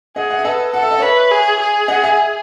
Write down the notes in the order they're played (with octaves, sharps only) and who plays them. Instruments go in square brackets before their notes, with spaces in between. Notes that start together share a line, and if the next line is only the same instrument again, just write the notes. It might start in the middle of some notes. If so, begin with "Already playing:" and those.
[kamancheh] G#4 [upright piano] D#5 F#5
[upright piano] D#5 F#5
E5
[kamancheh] A4 [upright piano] B4 D#5
[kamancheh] A4 [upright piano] F#5
[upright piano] E5
D#5
[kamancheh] B4 [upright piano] C#5 E5
[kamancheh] G#4
G#4
[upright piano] D#5 F#5
E5 G#5